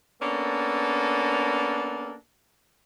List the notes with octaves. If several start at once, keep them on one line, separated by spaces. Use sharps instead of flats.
A#3 B3 C#4 D4 A4